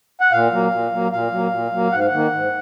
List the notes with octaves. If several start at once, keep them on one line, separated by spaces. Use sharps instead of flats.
F#5
A#2 F5
F#3 A#3
A#2
F#3 A#3
A#2 F5
F#3 A#3
A#2
F#3 A#3
G#2 F#5
F5
F#5
D#3 A#3
G#2